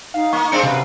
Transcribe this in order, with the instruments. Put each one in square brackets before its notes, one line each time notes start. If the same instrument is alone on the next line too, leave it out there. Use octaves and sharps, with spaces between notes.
[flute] D#4 [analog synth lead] F5
[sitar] A#3 [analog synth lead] C#6
[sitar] G#3 C4 D4 [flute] F5 [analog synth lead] C#7
[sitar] F#2 B4 [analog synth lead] C3